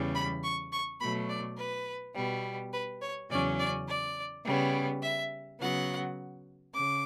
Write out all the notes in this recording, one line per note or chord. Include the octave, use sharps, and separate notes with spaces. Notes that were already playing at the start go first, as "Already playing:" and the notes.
Already playing: E2 C#3 E3 G3
B5
C#6
C#6
B2 F#3 A3 B5
D5
B4
B2 G3 B3
B4
C#5
E2 C#3 F#3 C#4 D5
D5
D5
C#3 G3 B3
E5
C#3 F#3 B3 F#5
C#3 D6